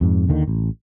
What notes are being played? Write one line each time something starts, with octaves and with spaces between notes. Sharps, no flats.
F2 G#2
D#2 D3 D#3
A1